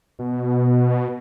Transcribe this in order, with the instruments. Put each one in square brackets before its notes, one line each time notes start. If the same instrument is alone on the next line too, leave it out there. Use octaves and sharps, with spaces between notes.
[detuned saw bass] B2